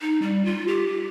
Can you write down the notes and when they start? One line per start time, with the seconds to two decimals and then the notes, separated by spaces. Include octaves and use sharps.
0.01 D#4
0.22 G3
0.45 F4
0.68 G4